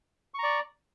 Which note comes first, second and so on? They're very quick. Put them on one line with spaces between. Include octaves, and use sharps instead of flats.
C#6 A#5 D5